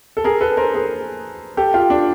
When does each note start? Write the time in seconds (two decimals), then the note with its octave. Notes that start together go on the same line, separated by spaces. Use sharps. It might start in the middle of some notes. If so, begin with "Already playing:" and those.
0.17 A4
0.24 G#4 A#4
0.41 A4 B4
0.57 A#4 C5
0.74 G#4 A#4
1.57 G4 A4
1.74 F4 G4
1.90 D4